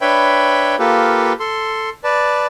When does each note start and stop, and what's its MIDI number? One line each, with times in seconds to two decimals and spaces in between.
0.01 0.75 62
0.01 0.75 71
0.01 0.75 73
0.01 0.75 76
0.01 0.75 79
0.01 0.75 83
0.79 1.33 58
0.79 1.33 65
0.79 1.33 67
0.79 1.33 69
0.79 1.33 71
1.40 1.89 69
1.40 1.89 84
2.04 2.46 71
2.04 2.46 74
2.04 2.46 81